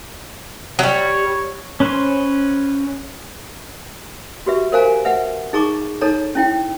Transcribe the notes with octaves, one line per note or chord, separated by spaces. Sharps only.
F#3 G3 C#5
C#4 B4 C5 B5 C6
F#4 G4 B4 E5
A#4 C5 F5 G#5 A#5
B4 E5 F#5
D#4 G#4 A#5 C#6 D6
D#4 A4 C#5 A#5
C#4 E4 G5